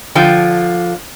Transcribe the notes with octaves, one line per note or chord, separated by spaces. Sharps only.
D3 F3 G5